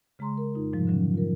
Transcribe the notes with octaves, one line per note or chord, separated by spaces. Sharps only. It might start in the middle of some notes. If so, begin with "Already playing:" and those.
C#3 G#3 G#4 A#5 C6
A#4
F2 D#4 F4
G#2 C3 F3 G3
D3 F#3 C#4
F4 A#4